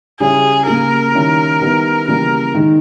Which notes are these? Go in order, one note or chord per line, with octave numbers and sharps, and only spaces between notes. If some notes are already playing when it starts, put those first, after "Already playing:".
C#3 G3 C#4 E4 G#4
C#3 G3 A#3 A#4
D#3 G3 C#4 E4
D#3 G3 B3 E4
C#3 E3 G3 A#3 A#4
D#3 G#3 D#4